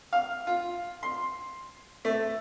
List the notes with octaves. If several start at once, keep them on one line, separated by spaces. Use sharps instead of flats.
F5
F4
C6
A3